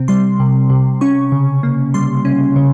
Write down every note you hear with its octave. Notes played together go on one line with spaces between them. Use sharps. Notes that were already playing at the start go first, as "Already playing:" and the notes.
Already playing: C3 C4
G3 C6
C3
C3
C#4 C#6
C#3
A#3
G3 C6
C#4
C#3